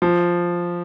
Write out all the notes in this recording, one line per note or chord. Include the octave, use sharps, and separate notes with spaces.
F3